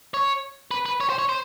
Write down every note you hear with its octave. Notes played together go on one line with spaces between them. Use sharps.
C#5
B4
B4
C#5
C5
C#5
C5